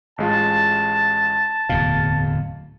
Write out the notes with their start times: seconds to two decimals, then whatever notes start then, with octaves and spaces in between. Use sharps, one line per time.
0.18 A1 G#3 F4 A5
1.69 D1 E2 B2 F5